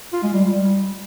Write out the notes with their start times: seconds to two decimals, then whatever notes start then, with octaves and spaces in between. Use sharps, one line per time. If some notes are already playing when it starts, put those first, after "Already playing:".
0.13 F4
0.23 G#3
0.34 G3
0.44 G3